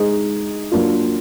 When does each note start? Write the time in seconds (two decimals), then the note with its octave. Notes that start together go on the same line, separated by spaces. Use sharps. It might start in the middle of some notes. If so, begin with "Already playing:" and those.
Already playing: G#3 D#4 G#4
0.72 F#3 A#3 D4 F4